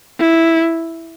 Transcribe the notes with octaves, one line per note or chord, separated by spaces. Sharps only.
E4